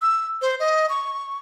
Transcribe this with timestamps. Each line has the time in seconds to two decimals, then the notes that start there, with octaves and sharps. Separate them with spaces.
0.02 E6
0.42 C5
0.60 D#5
0.89 C#6